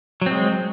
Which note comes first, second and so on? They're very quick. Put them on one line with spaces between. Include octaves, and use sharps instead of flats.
F#3 C4 G#3